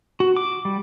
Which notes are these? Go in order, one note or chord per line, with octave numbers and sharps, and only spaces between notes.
F#4
D6
G3